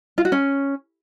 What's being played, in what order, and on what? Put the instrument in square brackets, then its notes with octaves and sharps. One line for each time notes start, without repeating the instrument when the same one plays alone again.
[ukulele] F4
F#4
C#4